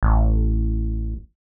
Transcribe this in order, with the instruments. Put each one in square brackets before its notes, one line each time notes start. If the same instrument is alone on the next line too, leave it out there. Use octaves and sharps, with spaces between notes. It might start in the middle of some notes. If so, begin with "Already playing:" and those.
[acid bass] A1